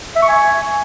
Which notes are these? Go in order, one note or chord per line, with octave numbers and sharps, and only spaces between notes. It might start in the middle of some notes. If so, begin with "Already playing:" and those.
E5
C#6
G#5